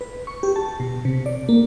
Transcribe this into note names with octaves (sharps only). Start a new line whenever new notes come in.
B4
C#6
G4
A5
B2
C3
D5
A#3